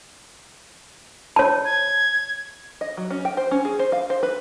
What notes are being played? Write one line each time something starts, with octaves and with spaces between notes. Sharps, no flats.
C#5 A5
G#6
D#5
F#3
C#4
G5
C5
C#4
G#4
C5
F5
C5
B4